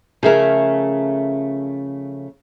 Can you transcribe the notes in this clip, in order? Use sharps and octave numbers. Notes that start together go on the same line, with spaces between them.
C#3 F3 A3 G#4 A#4 E5